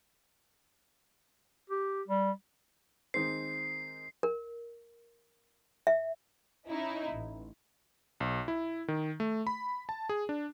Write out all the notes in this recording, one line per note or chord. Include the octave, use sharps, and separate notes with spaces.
G4
G3
D#3 G#3 C4 C7
A#4
E5
C#4 D#4 E4
A1
B1
E4
D#3
A3
B5
A5
G#4
D4